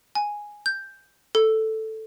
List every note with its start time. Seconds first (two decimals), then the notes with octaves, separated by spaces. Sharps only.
0.15 G#5
0.66 G6
1.35 A4